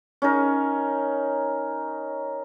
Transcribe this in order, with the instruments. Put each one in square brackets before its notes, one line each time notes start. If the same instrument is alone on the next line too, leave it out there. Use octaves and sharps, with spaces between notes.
[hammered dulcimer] C#4 D#4 A#4